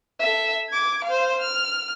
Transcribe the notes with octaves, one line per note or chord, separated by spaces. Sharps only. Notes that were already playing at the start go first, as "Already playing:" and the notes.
A4 E5
D6 G#6
C5 F5
F6